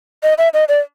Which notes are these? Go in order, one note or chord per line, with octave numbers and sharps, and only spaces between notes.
D#5
E5
D#5
D5